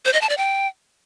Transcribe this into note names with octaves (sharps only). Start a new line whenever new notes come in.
C5
D#5
A5
D5
G5